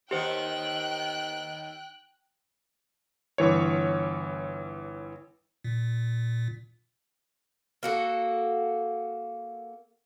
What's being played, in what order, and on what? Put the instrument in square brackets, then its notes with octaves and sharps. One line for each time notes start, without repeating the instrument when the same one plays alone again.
[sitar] D#2 D#3 B3 [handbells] G4 C5 [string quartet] G5 F#6
[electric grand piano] G1 E3 C#5
[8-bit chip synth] A#2
[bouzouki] A#3 F#4 A4